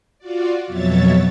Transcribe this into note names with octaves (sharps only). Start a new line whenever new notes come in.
F4 F#4 D5
F2 B2 F#3 C#5 E5 A6